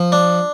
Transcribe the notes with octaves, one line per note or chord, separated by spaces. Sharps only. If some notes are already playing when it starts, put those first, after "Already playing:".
Already playing: F3
D4